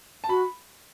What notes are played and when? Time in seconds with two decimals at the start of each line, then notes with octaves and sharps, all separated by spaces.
0.24 A5
0.29 F#4 B5